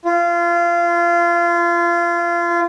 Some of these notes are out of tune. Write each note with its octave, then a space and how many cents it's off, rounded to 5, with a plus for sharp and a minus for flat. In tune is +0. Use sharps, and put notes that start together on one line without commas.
F4 -25